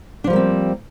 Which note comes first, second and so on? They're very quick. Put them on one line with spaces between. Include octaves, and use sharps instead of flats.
D4 F3 G3 A#3 C4